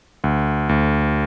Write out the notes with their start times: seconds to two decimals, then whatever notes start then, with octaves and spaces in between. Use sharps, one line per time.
0.24 D2
0.69 D2